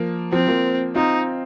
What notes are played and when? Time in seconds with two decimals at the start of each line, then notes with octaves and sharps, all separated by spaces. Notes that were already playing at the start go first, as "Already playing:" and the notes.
Already playing: F3 A#3
0.32 F3 C4
0.48 F3 A#3
0.95 C4 D#4 F4